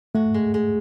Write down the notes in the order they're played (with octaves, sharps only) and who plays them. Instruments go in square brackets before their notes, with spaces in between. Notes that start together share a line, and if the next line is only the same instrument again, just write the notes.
[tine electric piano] A3 [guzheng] F#4
[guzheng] G#3
G#3